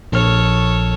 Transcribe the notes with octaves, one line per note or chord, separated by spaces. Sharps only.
A#1 A4 C#5 F6